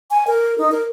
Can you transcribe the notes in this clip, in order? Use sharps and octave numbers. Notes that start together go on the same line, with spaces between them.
G#5
A#4
D#4
A#4